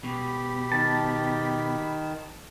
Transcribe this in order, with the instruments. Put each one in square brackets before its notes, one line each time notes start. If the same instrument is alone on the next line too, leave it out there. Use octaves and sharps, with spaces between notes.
[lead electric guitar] B2 [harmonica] G4 B5
[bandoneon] D#3 [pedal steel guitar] A5